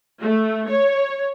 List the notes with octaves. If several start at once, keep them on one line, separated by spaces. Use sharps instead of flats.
A3
C#5